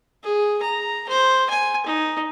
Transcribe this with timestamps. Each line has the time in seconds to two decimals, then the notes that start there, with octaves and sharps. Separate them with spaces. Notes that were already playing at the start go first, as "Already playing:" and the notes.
0.23 G#4
0.62 A#5
1.09 C5
1.50 G#5
1.86 D#4